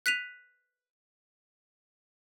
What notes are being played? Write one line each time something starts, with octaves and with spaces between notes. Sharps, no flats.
F#6 B6 D#7 F7